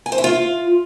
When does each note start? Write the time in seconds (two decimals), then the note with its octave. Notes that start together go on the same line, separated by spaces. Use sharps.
0.06 G#5
0.12 C5
0.18 E4
0.24 F4